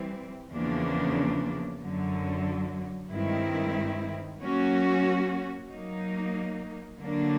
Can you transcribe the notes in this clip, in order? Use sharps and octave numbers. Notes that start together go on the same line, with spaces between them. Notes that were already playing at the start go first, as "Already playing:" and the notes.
Already playing: E3 G3 C4
E2 C#3 F3 A#3 D4
F#2 D3 F#3
G2 D#3 G#3 C4 E4
F#3 A#3 C#4 F#4
F#3 A#3 D#4
D3 F#3 A#3 D4